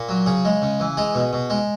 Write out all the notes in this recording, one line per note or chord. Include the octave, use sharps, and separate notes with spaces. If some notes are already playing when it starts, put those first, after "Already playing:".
Already playing: A#2
F#3
C#3 G#4
G#3
C#3
E3
G#3 G#4
B2
B2
G#3